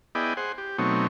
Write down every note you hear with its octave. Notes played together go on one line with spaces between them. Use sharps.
B3 E4 G#4 D5 D#5 G5
G#4 C5 F#5
G4
B2 F#3 A3 C4 D#4 C#5